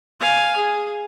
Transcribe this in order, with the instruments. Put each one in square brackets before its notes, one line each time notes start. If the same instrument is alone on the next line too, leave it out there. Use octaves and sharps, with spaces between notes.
[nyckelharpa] F5 G#5
G#4